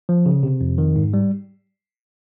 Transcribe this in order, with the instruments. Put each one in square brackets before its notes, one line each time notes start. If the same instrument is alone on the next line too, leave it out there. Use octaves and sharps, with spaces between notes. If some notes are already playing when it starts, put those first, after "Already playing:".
[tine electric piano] F3
C#3
C3
F2
D#3
G#2
G3